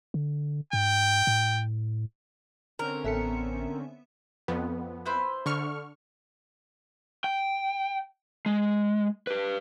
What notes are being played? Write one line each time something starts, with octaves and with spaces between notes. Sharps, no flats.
D3
G#2 G5
A2
D3 C4 C#4 A#4
A1 B3 A4 E5 C#7
F2 B3
E4 B4 C5
D3 C#6 F6
G5
G#3
G4 B4